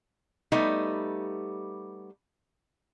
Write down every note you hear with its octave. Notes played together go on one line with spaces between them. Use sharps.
G3 A3 B3 D#4